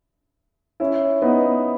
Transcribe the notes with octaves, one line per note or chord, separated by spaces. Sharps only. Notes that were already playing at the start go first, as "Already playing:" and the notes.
C#4 E4
B3 D#4